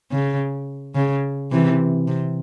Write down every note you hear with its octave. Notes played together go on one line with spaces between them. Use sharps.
C#3
C#3
C3 E3
C3